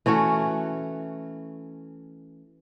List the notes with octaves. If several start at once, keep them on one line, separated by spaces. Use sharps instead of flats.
E3 A3 C#4 F#4